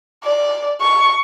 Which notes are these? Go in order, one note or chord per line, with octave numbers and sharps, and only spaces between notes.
D5
C#6